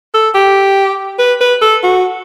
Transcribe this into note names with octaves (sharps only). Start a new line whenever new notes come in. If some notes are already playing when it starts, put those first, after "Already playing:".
A4
G4
B4
B4
A4
F#4